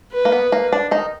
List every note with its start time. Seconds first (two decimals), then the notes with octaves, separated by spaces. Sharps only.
0.12 B4
0.25 A#3
0.32 B3
0.52 A#3
0.73 D4
0.91 D#3 D#4